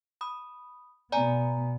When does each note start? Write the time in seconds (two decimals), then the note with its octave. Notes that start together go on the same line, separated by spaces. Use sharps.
0.21 B5 D#6
1.12 B2 B3 D5 G#5 A#5